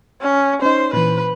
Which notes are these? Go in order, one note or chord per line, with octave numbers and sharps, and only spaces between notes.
C#4
C#4 D#4 C5
A#2 E3 B4